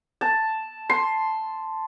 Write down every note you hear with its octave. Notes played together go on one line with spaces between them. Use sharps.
A5
C6